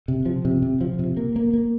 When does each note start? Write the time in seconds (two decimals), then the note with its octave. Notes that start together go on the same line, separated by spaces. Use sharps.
0.08 C3
0.26 F3
0.45 C3
0.62 C3
0.81 F3
0.99 C3
1.17 A#3
1.36 A#3
1.53 A#3